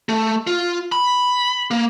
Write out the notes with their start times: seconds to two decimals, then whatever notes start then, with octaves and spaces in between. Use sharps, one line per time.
0.09 A3
0.47 F4
0.92 B5
1.71 A#3